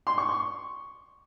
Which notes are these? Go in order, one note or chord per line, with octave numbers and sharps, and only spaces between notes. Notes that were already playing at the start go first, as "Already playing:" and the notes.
C6
C#6
C#6